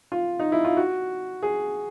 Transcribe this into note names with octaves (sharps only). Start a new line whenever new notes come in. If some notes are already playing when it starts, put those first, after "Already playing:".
F4
D#4
E4
F4
F#4
G#4